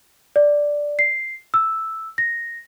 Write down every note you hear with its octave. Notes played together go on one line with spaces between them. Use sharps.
D5
C7
E6
A#6